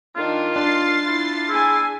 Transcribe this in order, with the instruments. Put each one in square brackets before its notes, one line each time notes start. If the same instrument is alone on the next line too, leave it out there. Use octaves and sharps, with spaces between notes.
[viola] D#3 [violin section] D4 [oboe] F4
[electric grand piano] D4 [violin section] C6 A6 C7
[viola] E4 [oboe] F4
[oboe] E4 [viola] G#4 G#5